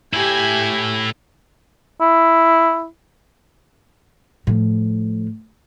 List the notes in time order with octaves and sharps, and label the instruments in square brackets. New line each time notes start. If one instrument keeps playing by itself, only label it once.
[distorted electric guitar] A2 E4 [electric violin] G4 G#5
[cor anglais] E4
[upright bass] A2 F3